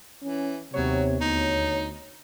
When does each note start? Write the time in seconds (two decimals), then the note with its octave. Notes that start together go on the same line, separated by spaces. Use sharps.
0.22 E3 C#4
0.74 D#2 C3 F#3 B3 C#5
1.21 D2 D#4